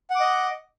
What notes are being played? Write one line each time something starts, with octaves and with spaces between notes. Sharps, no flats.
D#5 F#5 D6